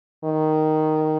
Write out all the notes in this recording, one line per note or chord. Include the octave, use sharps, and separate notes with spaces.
D#3